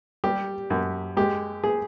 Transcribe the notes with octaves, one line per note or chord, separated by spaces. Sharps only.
G3 G4
F#2
G#3 G4
G#4